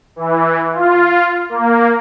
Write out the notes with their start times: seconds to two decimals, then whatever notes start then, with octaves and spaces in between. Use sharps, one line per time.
0.16 E3
0.73 F4
1.49 A#3